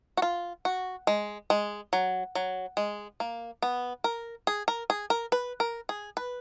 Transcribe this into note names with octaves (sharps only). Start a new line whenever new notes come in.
F#4
F4
F#4
G#3
G#3
F#3
F#3
G#3
A#3
B3
A#4
G#4
A#4
G#4
A#4
B4
A#4
G#4
B4